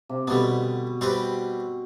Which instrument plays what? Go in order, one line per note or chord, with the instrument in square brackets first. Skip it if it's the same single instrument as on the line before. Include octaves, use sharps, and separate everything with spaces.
[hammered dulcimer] C3
[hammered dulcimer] B2 [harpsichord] D3 G3 B3
[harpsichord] G3 C4 G4 B4